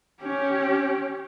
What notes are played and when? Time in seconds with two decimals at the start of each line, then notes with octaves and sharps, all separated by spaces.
0.23 C#4 G4